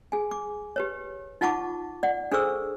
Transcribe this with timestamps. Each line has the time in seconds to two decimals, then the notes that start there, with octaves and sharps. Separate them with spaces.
0.12 G#4 G#5
0.31 D6
0.76 G4 B4 C#5
1.41 D#4 F4 F#5 A5 C#6 D6
2.03 D5 F#5
2.32 D4 G#4 A4 C5 C#6 E6